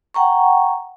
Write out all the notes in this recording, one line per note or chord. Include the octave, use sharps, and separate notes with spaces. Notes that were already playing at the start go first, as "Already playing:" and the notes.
F#5 G5 A#5 C#6